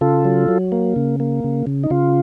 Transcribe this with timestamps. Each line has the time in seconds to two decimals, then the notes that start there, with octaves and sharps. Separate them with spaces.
0.01 C#3 F4 A4
0.25 F#3
0.48 F#3
0.72 A#3
0.96 C#3
1.20 A#3
1.44 C#3
1.67 C#3
1.84 D#4
1.90 C#3 F4